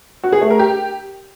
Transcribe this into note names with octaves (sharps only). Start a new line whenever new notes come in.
F#4
G#4
A3
A#4
G4